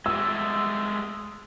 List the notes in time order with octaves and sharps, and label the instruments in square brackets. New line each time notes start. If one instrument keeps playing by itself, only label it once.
[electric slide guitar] G#3 A3 G4 [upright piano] E6